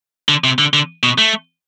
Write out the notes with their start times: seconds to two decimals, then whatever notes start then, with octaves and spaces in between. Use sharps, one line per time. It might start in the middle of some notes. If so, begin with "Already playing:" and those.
0.29 D3
0.44 C3
0.59 D3
0.73 D3
1.03 B2
1.18 A3